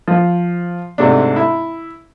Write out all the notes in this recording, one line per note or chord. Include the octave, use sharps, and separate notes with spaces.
F3
G#2 C3 A3 D4
E4